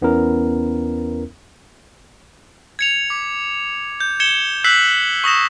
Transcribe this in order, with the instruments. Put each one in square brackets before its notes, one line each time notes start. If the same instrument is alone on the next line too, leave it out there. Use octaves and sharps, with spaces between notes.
[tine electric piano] E2 B3 C#4 E4 A#4
[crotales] G#6 C#7 F7
D6
G6
G#6 C#7 E7 G7
E6 F#6 G6 B6 C7 F#7
C#6 D#6 A#6 E7